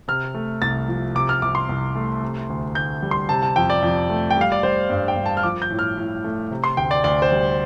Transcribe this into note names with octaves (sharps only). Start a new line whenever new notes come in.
C3 F6
A3
C2 A6
F3
C3 D6
F6
C2 D6
C6
C2
A3
C3
D2
D2 G6
G3
C6
C3 A5
A5
F2 G5
D5
F2
A3
G5
G3 F5
D5
G3 C5
G2 D5
G5
G2
A5
F6
F3 D6
G6
A2
F6
A2
A3
C3
C6
D2 G5
D5
D2 D5
C5
G3